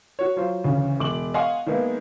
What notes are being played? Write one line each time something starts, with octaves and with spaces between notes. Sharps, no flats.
F#4 C#5
F#3 F4 C5
D2 C#3 E3
E1 D6 F#7
D#5 F5 F#5 G#5 C6 C#6
D#3 G#3 A#3 B3 D#4 E4